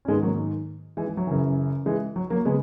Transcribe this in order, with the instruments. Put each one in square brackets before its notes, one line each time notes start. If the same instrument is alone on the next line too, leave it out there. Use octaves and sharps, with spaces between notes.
[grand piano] C#4
G#2 D#3 G#3 B3
F#3 A#3
E3 G#3
E3
F#3
F#2 C#3 E3
E3 G#3
F#3
F#3 A#3
C#3 G#3 B3